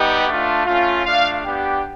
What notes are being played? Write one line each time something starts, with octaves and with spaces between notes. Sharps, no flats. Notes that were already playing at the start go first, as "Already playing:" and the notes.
Already playing: G3 B3 D#4 G4
A3 D4 F4
A3 C#4 F4
A3 D4 F4 F5
B3 D4 G4